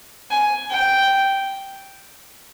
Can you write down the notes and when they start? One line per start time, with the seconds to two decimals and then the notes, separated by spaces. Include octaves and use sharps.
0.31 G#5
0.70 G5